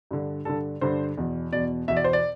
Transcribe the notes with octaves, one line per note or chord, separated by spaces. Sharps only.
G2 D3
G2 D3 A4
G2 D3 C5
E2 B2
E2 B2 D5
E2 B2 E5
D5
C5
D5